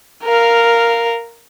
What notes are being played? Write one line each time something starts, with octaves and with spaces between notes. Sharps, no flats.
A#4 F5